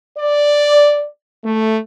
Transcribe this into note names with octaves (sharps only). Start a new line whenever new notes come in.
D5
A3